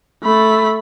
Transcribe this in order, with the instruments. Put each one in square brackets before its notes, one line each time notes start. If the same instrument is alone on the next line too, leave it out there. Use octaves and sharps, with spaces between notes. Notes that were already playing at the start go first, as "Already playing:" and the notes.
[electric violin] A3 B5